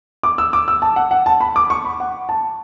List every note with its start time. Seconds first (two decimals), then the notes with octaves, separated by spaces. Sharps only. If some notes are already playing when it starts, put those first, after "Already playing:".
0.23 D6
0.38 E6
0.53 D6
0.68 E6
0.82 A5
0.96 F#5
1.11 F#5
1.26 A5
1.41 B5
1.56 D6
1.70 C#6
1.85 B5
2.00 F#5
2.29 A5